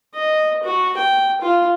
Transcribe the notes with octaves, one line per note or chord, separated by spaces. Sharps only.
D#5
F#4
G5
F4